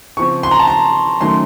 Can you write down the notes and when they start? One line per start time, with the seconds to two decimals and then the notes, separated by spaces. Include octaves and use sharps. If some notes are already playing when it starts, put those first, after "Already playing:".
0.17 C#3 F3 C4 C#6
0.43 C6
0.51 A#5
0.59 A5
0.67 A#5
1.21 D#3 F#3 A3 C#4 C6